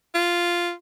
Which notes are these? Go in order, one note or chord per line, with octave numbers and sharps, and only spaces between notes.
F4